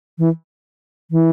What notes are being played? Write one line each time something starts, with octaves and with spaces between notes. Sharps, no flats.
E3
E3